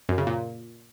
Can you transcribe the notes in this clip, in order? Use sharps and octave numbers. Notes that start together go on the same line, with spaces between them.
F#2
C#3
A#2